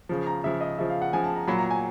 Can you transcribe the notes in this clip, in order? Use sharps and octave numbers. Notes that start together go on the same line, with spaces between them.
C#3 F3
A#5
C#3 F3 E5
D#5
C#3 F3 E5
F5
F#5
C#3 F3 G#5
A5
A#5
A#2 F#3 B5
A#5
G#5